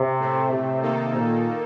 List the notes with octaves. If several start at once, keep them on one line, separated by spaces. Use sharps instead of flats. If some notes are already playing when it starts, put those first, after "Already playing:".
Already playing: C3
A2 A3 C4
C3
D#3 A#3 D#4 A4
A#2